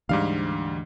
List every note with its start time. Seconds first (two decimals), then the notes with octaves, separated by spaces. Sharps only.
0.09 D2 G#2 E3 G3 D4 F5